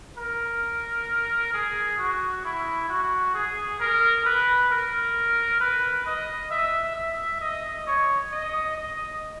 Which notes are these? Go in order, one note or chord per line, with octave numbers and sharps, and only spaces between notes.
A#4
G#4
F#4
E4
F#4
G#4
A#4
B4
A#4
B4
D#5
E5
E5
D#5
C#5
D#5
D#5